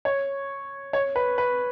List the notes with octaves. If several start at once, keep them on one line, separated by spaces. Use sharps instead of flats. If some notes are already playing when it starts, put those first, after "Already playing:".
C#5
C#5
B4
B4